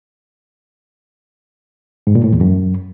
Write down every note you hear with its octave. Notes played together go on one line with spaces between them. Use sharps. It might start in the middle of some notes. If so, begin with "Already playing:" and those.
G#2
A#2
A2
E2
F#2